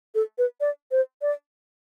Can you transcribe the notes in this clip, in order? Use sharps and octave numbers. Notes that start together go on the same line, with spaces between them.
A4
B4
D5
C5
D5